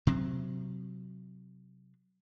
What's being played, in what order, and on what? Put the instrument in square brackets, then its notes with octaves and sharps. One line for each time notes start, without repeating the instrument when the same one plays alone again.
[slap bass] C3 F#3 C4